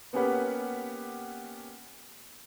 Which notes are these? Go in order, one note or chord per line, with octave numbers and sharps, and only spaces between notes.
A#3 B3 C#4 G4 B4 F#5